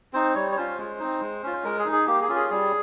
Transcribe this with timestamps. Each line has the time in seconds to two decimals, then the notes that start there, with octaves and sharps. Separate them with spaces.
0.13 C4 D#4 C5
0.35 G3 C#5
0.52 C#5
0.57 C#4 F4 C5
0.78 G#3
1.00 C4 D#4
1.21 G#3
1.43 C#4 F4
1.64 G#3 A#4
1.79 G#4
1.85 D#4
1.92 G#4
2.07 A#3 G4
2.22 G#4
2.29 C#4 F4
2.35 G#4
2.49 G3 G#4